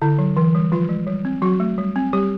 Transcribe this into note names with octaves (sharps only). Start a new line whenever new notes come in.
D3 E4
F#3
E3
G3
F3 F4
G#3
G3
C4
F#3 F#4
A3
G3
C4
G3 G4